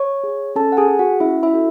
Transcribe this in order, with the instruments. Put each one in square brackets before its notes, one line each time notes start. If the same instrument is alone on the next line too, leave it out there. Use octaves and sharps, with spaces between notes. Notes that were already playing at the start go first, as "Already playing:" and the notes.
Already playing: [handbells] C#5 C#6
G#4
C#4 A4 A5
F#5
G#4 G#5
G#4
F#4 F#5
C#4 E4 E5
E4 E5
F#4 A4